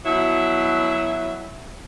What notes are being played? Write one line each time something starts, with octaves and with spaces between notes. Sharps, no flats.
B2 F#3 E4 E5